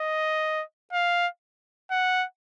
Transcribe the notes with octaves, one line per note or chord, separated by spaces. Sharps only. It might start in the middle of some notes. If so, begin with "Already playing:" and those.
Already playing: D#5
F5
F#5